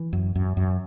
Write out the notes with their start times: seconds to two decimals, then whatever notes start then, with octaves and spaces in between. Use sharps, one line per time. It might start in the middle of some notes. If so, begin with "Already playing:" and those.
Already playing: E3
0.13 F#2
0.35 F#2
0.57 F#2